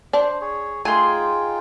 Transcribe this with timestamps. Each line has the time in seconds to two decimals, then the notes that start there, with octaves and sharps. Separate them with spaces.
0.13 D4 C5
0.41 G#4 C#5
0.85 A3 D#4 F4 G#4 G5 C6